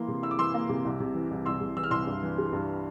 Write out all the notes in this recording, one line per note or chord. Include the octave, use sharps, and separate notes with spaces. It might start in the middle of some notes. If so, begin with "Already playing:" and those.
Already playing: E3 A#3 E4 C6
C3
E4 E6
D6
E3 C6 E6
A#3
C3
C2
C3
E3
C2
C2 C6 E6
C3
E3 E6
F6
C2 C6 E6
G2
E3
G3
G2